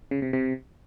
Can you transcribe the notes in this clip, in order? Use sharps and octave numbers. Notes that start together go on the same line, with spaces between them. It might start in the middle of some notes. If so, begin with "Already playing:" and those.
C#3
C3
C3